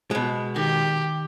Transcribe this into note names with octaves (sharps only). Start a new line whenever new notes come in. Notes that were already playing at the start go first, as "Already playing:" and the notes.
B2 G#3
D#3 G4 C6